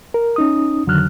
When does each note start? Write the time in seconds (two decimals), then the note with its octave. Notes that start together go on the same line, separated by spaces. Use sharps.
0.14 A#4
0.36 C#4 D#4 D#6
0.87 F2 D3 D#3 F#3 F6 F#6